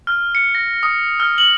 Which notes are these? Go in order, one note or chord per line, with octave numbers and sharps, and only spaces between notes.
F6
C#7
A#6
D#6
F6
F#7